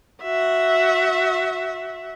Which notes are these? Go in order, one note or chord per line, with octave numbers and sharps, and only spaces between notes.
F#4 E5